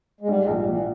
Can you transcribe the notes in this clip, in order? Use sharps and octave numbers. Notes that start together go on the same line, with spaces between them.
G#3
G#2 G3
G#3
A#1
G3
A#1 E3